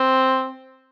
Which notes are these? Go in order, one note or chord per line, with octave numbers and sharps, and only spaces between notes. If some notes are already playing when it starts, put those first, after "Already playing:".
Already playing: C4